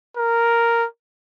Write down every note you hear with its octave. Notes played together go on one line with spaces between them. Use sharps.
A#4